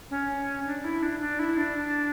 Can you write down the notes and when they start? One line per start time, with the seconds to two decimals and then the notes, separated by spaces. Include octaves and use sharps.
0.10 C#4
0.66 D4
0.84 E4
1.03 D4
1.20 D4
1.39 E4
1.57 D4